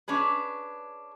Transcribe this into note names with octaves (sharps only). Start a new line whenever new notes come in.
C#4 D4 G#4 B4